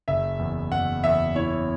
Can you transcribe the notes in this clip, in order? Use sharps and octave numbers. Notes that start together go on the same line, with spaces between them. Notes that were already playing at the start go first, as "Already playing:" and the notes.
F#1 E5
E2
F#1 F#5
E2 E5
E4 C#5